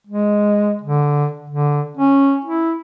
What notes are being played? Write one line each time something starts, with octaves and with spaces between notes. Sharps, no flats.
G#3
D3
D3
C#4
E4